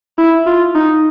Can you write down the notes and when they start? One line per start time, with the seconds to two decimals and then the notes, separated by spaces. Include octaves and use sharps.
0.18 E4
0.47 F4
0.75 D#4